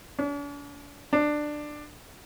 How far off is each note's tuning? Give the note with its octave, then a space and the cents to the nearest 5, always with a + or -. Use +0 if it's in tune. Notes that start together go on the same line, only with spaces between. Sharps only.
D4 -45
D4 +15